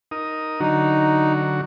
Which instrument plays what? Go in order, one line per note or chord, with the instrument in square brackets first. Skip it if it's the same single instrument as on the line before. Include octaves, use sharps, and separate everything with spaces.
[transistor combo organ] D#4 A#4 D#6
[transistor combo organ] D3 F#3 F#4 [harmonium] D#4